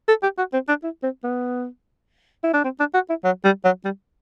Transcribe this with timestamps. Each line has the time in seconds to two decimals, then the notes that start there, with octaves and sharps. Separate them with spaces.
0.08 A4
0.23 G4
0.38 F#4
0.53 C4
0.68 D4
0.83 E4
1.03 C4
1.24 B3
2.44 E4
2.54 D4
2.64 C4
2.79 D4
2.94 F#4
3.09 E4
3.24 F#3
3.44 G3
3.64 F#3
3.85 G3